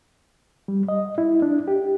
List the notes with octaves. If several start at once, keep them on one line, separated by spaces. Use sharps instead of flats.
G3
D#5
E4
D4
G4